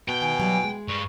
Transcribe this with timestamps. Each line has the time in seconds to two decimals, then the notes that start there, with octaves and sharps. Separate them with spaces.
0.08 B2 G5
0.21 D#3 G#5
0.39 E3 F#3 G3
0.64 G#3
0.88 G2 C#6